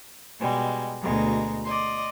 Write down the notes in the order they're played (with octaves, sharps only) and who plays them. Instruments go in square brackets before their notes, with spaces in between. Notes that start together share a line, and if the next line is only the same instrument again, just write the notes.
[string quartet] B2 G3 G#3
D2 B2 G#3 A#5
D5 D#5 C6